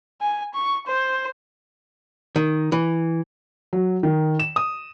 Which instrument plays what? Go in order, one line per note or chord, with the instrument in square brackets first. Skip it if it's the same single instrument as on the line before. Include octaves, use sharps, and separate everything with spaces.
[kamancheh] G#5
C#6
C5
[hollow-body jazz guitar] D#3
E3
[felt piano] F#3
D#3
E7
D#6